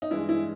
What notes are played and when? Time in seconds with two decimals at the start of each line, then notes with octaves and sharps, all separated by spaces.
0.02 D#4
0.10 G2 E3 G#3 E4
0.29 E4